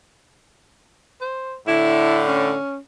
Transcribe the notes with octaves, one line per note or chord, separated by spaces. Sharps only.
C5
A2 D3 E4
C#4